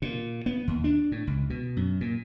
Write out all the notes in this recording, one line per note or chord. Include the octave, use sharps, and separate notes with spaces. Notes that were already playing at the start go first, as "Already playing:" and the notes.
A#2
B3
D#2
D4
A2
C#2
B2
F#2
A#2